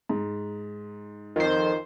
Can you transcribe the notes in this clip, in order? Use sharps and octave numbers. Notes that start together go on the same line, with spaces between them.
G#2
F2 D#3 C5